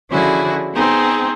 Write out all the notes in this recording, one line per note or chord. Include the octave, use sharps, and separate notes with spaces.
D3 F3 C#4 E4 F#4 G#4
B3 C4 D#4 G#4